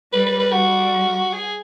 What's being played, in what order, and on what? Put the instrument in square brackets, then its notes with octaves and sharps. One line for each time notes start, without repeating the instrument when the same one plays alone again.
[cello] G3 [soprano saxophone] B4
[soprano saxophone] B4
B4
[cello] G3 [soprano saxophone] F#4
[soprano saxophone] G#4